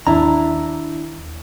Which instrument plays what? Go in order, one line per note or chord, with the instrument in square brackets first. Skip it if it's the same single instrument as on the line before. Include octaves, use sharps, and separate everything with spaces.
[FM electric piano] D#2 [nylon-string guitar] D4 E4 [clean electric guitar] A#5